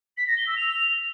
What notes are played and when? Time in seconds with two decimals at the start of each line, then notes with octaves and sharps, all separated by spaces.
0.17 B6
0.27 A#6
0.37 G7
0.46 E6
0.56 F7